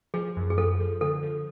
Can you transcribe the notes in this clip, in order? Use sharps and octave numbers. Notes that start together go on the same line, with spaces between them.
F3 G#4
F#2
G#4
F3 A4
F3
D3 A4
F3